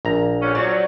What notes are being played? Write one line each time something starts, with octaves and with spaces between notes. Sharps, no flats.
A#1 A#5
A#2 D3 C#4
F3 F#3 D5